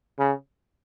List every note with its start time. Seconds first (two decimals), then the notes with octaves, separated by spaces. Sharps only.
0.19 C#3